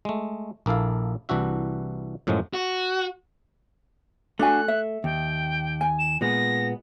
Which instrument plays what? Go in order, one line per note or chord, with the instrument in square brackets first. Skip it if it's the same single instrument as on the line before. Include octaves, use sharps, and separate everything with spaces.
[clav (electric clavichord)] G#3 A3
A#1 A#3 E4 A4 F5
C2 E3 D4 F#4 E5
F#2 A2 F3 F#3 G#3
[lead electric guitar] F#4
[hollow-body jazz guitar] A3 [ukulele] D4 F#4 G#5 [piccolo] F#6
[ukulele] E5
[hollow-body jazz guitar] D#2 [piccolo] G5
[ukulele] G#5
[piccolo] E7
[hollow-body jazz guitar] A#2 G#3 B3 [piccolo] A#6